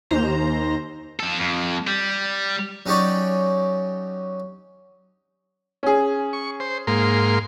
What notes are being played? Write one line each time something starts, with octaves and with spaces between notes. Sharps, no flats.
D#2 C5 A#5
F3 A4
F2
G3
F#3 C#4 D#4 G4 C#5 D5
C#4 G#4
C#6
C5
G#2 A#3 C6